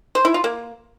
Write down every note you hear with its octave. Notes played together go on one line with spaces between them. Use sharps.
C5
E4
F4
A#3